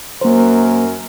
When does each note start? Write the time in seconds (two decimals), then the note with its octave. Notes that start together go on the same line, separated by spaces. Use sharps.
0.21 F#2 F#3 A#3 A#4 C5